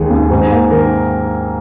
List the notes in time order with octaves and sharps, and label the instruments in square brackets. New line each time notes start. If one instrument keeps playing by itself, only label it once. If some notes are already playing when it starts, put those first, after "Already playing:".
Already playing: [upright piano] D#2 D#3 G#3 G#4
D#2
G#2
A#3
D#3 A#4